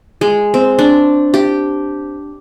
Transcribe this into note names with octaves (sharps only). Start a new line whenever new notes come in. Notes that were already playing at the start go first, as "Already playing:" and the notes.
G#3
C4
D4
G4